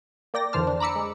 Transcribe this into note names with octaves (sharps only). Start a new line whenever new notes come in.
A#3 D5 G5 A#6
F2 D3 E3 C5 A5 F6
D4
A#5 B5 D6 E6 C#7
G#3